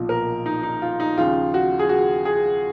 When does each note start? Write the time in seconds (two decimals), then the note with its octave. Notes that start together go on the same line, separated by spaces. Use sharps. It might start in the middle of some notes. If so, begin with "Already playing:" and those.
Already playing: B1 A#2 F3
0.09 A#4
0.46 D#4
0.63 D#4
0.82 F4
1.00 D#4
1.17 D#2 C#3 F3 F4
1.54 F#4
1.79 G#4
1.89 F#4
2.25 G#4